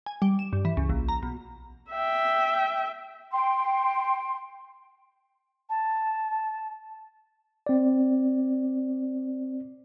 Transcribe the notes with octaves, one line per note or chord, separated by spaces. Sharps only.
G#5
G3
E7
G2
E3
C#2
A#1
A#5
B1
E5 G5
G5 C6
A5
C4 D5